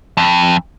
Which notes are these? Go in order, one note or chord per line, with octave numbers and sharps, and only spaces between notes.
F2